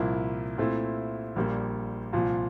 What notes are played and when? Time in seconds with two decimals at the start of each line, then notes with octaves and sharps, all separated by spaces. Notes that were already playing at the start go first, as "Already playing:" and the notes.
Already playing: C2 A#2 F3 A#3 E4
0.58 A#2 A3 C4 E4
1.36 A#1 A#2 G3 A#3
2.13 C2 A#2 F3